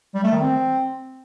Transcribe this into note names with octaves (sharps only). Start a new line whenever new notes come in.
G3
A3
D#3
C4